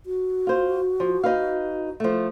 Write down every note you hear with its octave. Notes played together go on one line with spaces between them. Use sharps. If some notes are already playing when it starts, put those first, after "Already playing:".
F#4
F4 C5
F3
D#4 B4 F5
F3 A3